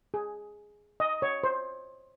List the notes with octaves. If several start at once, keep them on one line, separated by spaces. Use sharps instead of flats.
G#4
D#5
C#5
C5